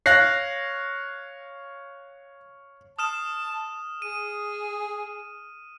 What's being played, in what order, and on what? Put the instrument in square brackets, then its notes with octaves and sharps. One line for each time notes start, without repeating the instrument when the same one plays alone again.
[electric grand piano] C#5 F5 [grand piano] F#6 A#6 C7
[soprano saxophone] A5 [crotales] D#6 F6 E7
[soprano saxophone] G#4 [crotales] D#7